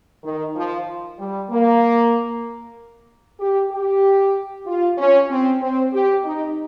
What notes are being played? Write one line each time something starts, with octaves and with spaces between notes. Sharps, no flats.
D#3
F3
G3
A#3
G4
G4
F4
C#4
C4
C4
G4
D#4